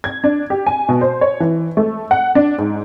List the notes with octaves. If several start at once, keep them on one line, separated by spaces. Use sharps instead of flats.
G#6
D4
G4
G#5
B2
C5
C#5
E3
A3
F#5
D4
G#2